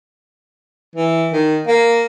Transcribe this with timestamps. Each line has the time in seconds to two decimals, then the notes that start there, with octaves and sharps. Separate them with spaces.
0.96 E3
1.33 D#3
1.68 A#3